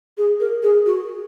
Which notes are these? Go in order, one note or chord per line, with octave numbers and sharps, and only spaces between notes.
G#4
A#4
G#4
F#4